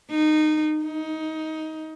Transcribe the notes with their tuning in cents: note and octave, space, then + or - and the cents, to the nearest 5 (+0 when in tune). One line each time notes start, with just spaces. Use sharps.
D#4 -20
D#4 +20